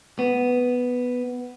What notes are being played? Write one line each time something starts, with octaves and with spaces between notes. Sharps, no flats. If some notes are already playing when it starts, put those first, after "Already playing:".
B3